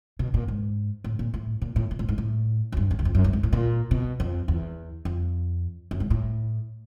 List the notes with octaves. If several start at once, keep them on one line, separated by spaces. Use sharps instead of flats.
B2
A#2
G#2
A2
A#2
A2
A#2
A2
A#2
A2
G#2
A2
F#2
G2
F#2
E2
F2
F#2
G2
G#2
A2
A#2
B2
F2
E2
F2
F#2
G#2
A2